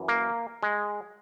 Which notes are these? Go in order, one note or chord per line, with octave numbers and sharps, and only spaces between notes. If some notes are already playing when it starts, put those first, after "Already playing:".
Already playing: F#2 E3
A#3
G#3